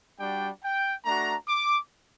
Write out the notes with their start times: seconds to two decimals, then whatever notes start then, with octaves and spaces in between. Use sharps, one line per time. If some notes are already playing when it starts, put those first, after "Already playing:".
0.19 G3 D4 F#4 G5
0.63 G5
1.04 A3 D4 F#4 A#5
1.47 D6